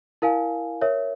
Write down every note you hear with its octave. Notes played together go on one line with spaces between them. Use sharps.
E4 A#4 F5 G#5
A#4 C#5 E5